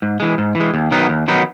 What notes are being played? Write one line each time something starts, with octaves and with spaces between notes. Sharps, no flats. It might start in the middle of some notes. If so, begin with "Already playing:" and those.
G#2
E3 G#3
G#2
E3 G#3
D#2
D#3 F#3 B3 D#4
D#2
D#3 F#3 B3 D#4